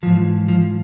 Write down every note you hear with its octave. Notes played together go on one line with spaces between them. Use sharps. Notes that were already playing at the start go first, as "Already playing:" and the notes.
G#2 E3 F3
F3